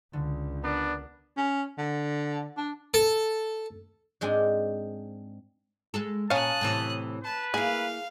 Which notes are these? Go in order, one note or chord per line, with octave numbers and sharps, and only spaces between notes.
C#2 D3
B3 D4 A#4 D5
C#4
D3
D4
A4
G#2 G#3 C4 D4 G5 G#5
G#3 G#4 A4
A#2 C#4 F5 A5 D#6 F#6
A2 C3 E3
B4 A5
A#3 E4 G#4 F5